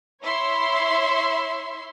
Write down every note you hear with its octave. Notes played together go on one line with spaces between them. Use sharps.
E4 C#5 E5 C6